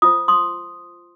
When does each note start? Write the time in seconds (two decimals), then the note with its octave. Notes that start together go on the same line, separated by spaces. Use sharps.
0.02 F4 C5 D#6
0.28 C6 D#6